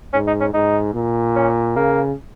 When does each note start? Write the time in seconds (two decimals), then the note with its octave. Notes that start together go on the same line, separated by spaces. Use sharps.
0.13 G#2 C#4
0.27 D#4
0.41 C#4
0.54 G#2 D#4
0.94 A#2
1.36 C#4
1.76 C#3 A#3